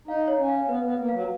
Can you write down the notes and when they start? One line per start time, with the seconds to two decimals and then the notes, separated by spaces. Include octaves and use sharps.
0.07 D#4 F5
0.28 C#5
0.39 C#4
0.48 F5
0.68 B3 B4
0.84 B3 B4
0.99 A#3
1.09 F#3 F5